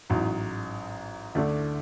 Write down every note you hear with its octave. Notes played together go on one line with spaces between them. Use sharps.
A1 G#2 F#3
D2 D3 A3 D4